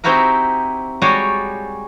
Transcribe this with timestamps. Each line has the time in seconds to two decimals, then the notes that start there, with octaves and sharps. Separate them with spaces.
0.04 C4 D#4 E4 F#4 G4 A#4
1.02 G3 G#3 F#4 G4 C#5 D5